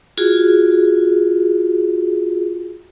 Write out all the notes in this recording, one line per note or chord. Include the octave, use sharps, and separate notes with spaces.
F4 F#4 G#4